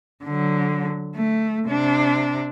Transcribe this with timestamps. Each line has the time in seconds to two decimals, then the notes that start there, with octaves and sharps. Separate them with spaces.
0.25 D3 F#3
1.16 A3
1.67 C3 D4